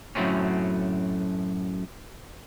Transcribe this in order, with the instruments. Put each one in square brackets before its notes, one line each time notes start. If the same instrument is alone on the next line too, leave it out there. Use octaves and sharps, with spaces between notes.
[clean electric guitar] F#2 A2 F#3 A3 C4 C#4